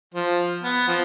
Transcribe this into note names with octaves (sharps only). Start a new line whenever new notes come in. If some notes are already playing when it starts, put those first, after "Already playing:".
F3
B3
F3